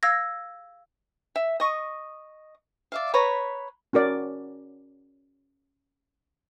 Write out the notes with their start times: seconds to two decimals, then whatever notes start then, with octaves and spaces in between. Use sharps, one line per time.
0.03 F5 E6 G#6 A#6
1.36 E5
1.60 D#5 C#6 D#6
2.92 D5 E5 F5
3.14 B4 C#5 A#5 B5
3.93 C#4 F#4 A#4 D5